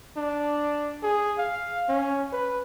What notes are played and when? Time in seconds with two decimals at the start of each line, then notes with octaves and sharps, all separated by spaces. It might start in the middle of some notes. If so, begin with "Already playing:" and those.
0.17 D4
1.03 G#4
1.38 F5
1.89 C#4
2.32 B4